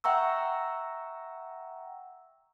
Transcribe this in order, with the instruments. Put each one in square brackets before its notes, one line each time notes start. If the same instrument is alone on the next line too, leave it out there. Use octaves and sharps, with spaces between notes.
[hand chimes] E5 F#5 G5 A#5 C#6 E6